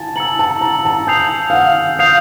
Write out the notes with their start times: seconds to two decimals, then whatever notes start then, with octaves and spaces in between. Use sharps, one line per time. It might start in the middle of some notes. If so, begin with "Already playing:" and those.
Already playing: G#5 A5
0.16 A#5 E6 A6 C#7 F#7
0.39 A5
0.61 A#5
0.85 A5
1.07 G#5 D#6 G6 C7 F7
1.50 F5
1.53 F#5
1.99 F5 D#6 G6 C7 F7